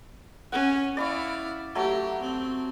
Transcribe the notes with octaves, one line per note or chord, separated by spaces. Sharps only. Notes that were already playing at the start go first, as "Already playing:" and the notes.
C#4 F#5
E4 D5 F5 B5 C#6
F#3 A3 G4
C4